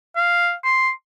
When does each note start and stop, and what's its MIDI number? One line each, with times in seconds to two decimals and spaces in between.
0.16 0.54 77
0.64 0.91 84